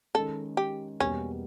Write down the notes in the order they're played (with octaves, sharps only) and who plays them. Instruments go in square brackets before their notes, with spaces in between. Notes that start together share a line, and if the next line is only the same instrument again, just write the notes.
[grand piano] D#3 G#3 C#4 [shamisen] A4
[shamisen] G4
[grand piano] E2 B2 G3 A#3 [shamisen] C#4